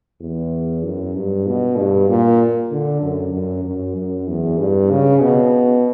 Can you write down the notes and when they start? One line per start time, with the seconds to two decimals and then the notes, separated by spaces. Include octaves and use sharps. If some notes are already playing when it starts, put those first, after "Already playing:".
0.21 E2
0.84 F#2
1.16 G2
1.47 B2
1.78 G2
2.09 A#2
2.71 D3
3.02 F#2
3.33 F#2
3.64 F#2
3.96 F#2
4.28 E2
4.58 G2
4.90 C#3
5.21 B2